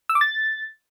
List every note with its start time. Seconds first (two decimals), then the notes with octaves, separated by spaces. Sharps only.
0.09 E6
0.15 D6
0.21 A6